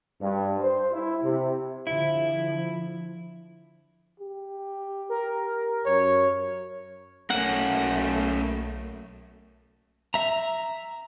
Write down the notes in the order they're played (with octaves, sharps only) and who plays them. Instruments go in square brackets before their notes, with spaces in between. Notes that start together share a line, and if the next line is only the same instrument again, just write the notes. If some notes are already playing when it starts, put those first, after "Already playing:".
[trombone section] G2
C5
E4
C3
[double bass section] D3 F3 [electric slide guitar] E4
[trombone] G4
[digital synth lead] A#4
[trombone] F#2 [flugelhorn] C#5
[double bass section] B1 A3 [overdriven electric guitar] A#3 C#4 [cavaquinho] F#5
[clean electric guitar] E5 A#5